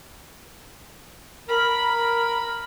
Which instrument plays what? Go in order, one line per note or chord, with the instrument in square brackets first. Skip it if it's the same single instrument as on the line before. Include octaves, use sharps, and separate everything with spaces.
[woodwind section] A#4 [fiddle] B5